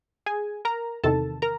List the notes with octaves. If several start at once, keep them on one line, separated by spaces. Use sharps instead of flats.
G#4 G#5
A#4 A#5
E2 C3 D#3 A4 A5
A#4 A#5